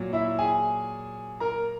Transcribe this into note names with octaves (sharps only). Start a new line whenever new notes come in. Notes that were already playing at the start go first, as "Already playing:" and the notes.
Already playing: A#2 F#3
E4 E5
G#4 G#5
A#4 A#5